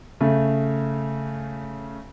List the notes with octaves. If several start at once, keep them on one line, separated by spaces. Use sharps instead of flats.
C#3 A3